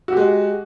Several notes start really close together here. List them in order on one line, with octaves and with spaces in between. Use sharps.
F#4 G4 G#3